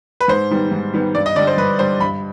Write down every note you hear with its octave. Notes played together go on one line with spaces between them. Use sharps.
B4
G#2 C5
D#3 G3 B3
G#2
D#3 G3 B3
G2 D5
D#5
D3 G3 D5
C5
G2 B4
D3 G3 C5
G2 B5